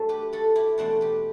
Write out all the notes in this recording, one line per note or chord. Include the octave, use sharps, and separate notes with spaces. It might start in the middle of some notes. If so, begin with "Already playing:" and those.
Already playing: G2 F#3 A3 A4
G4 B4
F#4 A4
E4 G4
E2 B2 A3 C4 D4 F#4
G4 B4